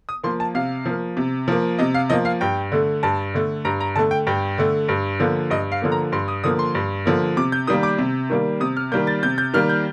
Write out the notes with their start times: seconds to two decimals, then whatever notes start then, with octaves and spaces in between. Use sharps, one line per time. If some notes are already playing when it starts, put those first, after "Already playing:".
0.09 D#6
0.23 F3 A#3 C6
0.40 A5
0.55 C3 F5
0.86 F3 A#3
1.17 C3
1.48 F3 A#3
1.79 C3 D#5
1.94 F5
2.10 F3 A#3 D#5
2.25 F5
2.41 G2 G5
2.72 D3 A3
3.03 G2 A5
3.34 D3 A3
3.65 G2 A#5
3.81 A#5
3.96 D3 A5
3.99 A3
4.11 G5
4.27 G2 G5
4.58 D3 A3
4.89 G2
5.20 D3 F3 A#3
5.50 G2 D#5
5.72 F5
5.82 D3 F3 A#3
5.92 A#5
6.12 G2 C6
6.28 D#6
6.44 D3 F3 A#3 D#6
6.59 C6
6.75 G2
7.06 D3 F3 A#3
7.37 C3 D6
7.52 G6
7.67 D#3 G3 A#3 D#6
7.83 D6
7.98 C3
8.30 D#3 G3 A#3
8.60 C3 D#6
8.77 F6
8.92 D#3 G3 A#3 G6
9.07 A6
9.23 C3 G6
9.38 G6
9.54 D#3 G3 A#3 F6
9.69 G6